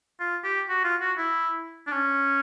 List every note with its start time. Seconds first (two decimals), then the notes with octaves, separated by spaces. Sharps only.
0.20 F4
0.44 G4
0.69 F#4
0.84 F4
1.01 F#4
1.18 E4
1.87 D4
1.91 C#4